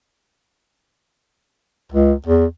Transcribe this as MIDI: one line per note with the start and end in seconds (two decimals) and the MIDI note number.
1.92 2.13 37
2.26 2.45 40